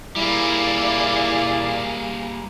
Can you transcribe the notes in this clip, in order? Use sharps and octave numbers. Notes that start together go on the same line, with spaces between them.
G3 A#3 E4 G#4 D5 F5